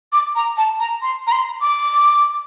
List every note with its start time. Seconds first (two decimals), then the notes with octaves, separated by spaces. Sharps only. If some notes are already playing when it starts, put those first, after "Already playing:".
0.13 D6
0.35 A#5
0.57 A5
0.80 A#5
1.02 C6
1.27 A#5
1.32 C6
1.61 D6